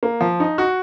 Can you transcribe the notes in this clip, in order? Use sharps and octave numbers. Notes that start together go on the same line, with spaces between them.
A#3
F3
D#4
F#4